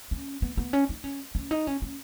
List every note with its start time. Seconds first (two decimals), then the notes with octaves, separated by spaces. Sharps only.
0.11 C#4
0.42 B3
0.57 B3
0.73 C#4
0.89 D#4
1.04 C#4
1.35 C#4
1.51 D#4
1.67 C#4
1.82 C#4